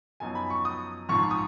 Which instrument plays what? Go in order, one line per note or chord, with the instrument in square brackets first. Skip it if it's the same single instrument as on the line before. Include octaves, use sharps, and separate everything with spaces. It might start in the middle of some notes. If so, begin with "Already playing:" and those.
[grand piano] F#2 F3 B3 D#4 G#5
B5
C#6
D#6
A#1 G#2 F3 C#6
D#6